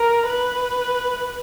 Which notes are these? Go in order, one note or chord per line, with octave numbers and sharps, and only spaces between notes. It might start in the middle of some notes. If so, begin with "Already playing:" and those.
Already playing: A#4
B4